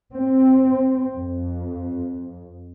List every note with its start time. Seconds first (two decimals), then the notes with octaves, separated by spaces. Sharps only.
0.12 C4
1.16 F2